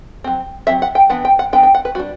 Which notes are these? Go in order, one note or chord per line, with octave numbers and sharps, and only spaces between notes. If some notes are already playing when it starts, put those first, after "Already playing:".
F#3 C4
F#3 C4 E5
F#5
G5
E3 B3 D4 F#5
G5
F#5
E3 B3 D4 G5
G5
F#5
B4
G3 D4 F#4